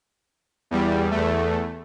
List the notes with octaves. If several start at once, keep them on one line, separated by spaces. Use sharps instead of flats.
E2 G3
E2 A3